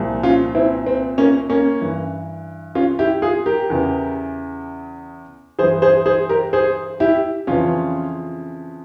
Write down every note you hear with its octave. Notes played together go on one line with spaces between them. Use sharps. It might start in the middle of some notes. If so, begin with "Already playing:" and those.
Already playing: C2 A#2 F3
C#4 F4
C4 E4
C4
A#3 C#4
A#3 C#4
G2 E3
C#4 F4
E4 G4
F4 G#4
G4 A#4
E2 C#3 E3
G2 E3 G#4 C5
G#4 C5
G#4 C5
G4 A#4
G#4 C5
E4 G4
F2 C#3 E3 C#4 F4